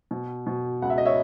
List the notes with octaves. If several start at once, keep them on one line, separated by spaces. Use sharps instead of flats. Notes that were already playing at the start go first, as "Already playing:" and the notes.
B2
B2
C#2 F#5
E5
D#5
C#5 E5